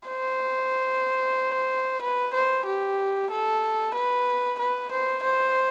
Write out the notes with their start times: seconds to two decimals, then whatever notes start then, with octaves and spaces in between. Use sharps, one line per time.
0.08 C5
2.02 B4
2.33 C5
2.66 G4
3.31 A4
3.95 B4
4.59 B4
4.91 C5
5.24 C5